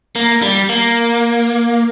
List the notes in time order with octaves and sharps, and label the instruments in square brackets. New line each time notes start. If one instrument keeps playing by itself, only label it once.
[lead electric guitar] A#3
G3
A#3